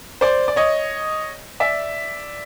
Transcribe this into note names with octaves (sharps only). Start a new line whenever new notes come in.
C5 D5
D5
C#5 D#5
D5 E5